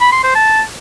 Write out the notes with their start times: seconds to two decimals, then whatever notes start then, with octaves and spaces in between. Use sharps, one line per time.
0.01 B5
0.12 C6
0.24 C5
0.35 A5